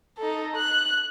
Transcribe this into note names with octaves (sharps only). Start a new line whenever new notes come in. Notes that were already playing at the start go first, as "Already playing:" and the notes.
D#4 A4
F#6